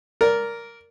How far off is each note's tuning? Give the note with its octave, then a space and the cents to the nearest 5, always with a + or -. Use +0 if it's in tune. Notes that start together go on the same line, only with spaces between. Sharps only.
A#4 +0 D5 -20